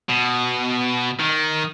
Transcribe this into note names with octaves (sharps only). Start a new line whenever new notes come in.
B2
D#3